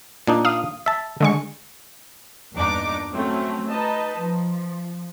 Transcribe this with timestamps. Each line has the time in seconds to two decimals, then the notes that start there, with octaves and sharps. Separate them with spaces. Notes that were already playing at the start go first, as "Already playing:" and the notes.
0.27 A#2 D4 D#4
0.45 F5 D#6
0.86 E5 A5
1.20 D3 G#3 C#6
2.53 E2 G2 A#2 D4 D#4 D6
3.12 F#3 A3 C4 C#4
3.69 D#4 B4 D#5 A5
4.16 F3